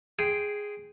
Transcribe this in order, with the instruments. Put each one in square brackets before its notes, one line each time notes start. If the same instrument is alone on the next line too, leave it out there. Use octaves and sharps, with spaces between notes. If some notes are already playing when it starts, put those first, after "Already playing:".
[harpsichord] G#4 G5 C6